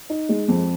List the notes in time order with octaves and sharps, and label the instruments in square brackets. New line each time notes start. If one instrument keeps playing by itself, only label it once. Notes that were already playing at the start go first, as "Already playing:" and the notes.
[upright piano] D#4
G#3
F2